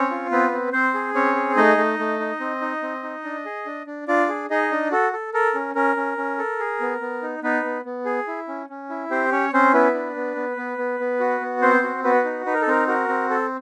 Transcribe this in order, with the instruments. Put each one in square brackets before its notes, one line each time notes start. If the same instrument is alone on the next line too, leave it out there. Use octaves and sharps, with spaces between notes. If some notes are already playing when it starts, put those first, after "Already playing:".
Already playing: [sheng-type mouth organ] C4 C#4 C#5
F4
B3 C4 B4
C4
C4 C5
G#4
C4 C#4 C#5
G#4
A3 D#4 D#5
A3
A3
D#4
C4
D#4
C4
D#4
D4
G#4
D4
D4
D4 F4 D5
G#4
D#4 G#4 D#5
D4
F#4 A4
A4
A4 A#4
C#4
C#4 A#4
C#4
C#4
A4
G#4
B3
B3
D#4
B3 D#4 B4
B3
B3
G#4
E4
C#4
C#4
E4
C4 G4 C5
C#4 C#5
C4 C#4 C5
B3 E4 B4
D4
B3
B3
B3
B3
B3
F#4
B3
C4 C5
F#4
B3 F#4 B4
D#4
D#4 B4
A#4
A4
C4 A#4
F#4 A#4
C4
A4